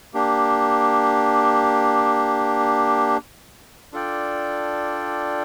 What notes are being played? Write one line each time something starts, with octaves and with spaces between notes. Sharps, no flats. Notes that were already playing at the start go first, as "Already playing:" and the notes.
A#3 D4 G4
D4 F4 A4 D5 G5